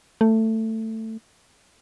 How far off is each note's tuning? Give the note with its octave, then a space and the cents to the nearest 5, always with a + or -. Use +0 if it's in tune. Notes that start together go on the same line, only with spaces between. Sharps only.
A3 +15